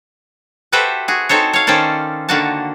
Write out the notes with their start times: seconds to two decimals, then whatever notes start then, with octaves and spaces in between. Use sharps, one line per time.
0.72 F#4 G4 A4 B4 C5 E5
1.08 F#4 G#4
1.29 C4 D#4 A4 C5 C#5
1.53 C#5 F5
1.67 D#3 C#4 A4 C5 D5
2.29 D3 D#3 A#3 F#4 A5